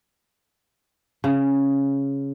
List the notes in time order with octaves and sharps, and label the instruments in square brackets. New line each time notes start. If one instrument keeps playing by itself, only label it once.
[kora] C#3